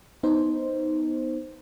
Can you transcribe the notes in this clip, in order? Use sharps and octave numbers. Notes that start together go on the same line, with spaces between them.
B3 D#4 C5